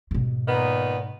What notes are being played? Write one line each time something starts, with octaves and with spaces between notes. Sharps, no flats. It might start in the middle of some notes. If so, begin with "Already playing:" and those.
G#2 B2
A#2 D#3 B3